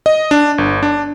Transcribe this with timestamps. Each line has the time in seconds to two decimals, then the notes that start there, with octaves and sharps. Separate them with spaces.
0.06 D#5
0.31 D4
0.58 G1
0.83 D4